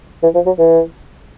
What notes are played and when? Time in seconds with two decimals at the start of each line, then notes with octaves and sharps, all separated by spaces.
0.23 E3
0.35 F3
0.46 F#3
0.58 E3